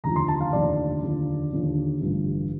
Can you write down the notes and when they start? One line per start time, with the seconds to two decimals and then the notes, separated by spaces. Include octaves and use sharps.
0.04 F1 D#2 D3 F3 A#5
0.16 C6
0.28 A5
0.41 F5
0.53 F1 D#2 D3 F3 D5
1.02 D#2 D3 F3
1.52 D#2 D3 F3
2.01 A1 G2 D3 F3